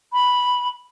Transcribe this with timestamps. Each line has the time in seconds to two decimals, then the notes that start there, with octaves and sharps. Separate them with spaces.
0.13 B5